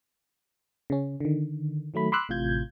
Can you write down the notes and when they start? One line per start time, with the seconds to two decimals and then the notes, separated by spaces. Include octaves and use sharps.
0.90 C#3 C#4
1.20 D3 D#3
1.94 D#3 F#3 A3 B5
2.12 B5 C6 D6 E6 F#6
2.29 A1 A2 C3 F4 G6 G#6